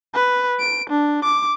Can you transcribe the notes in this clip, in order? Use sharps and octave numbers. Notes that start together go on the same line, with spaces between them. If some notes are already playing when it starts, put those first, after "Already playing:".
B4
D7
D4
D6